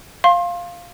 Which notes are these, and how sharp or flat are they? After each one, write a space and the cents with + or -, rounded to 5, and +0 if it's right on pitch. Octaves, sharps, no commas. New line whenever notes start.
F5 +0 C6 +30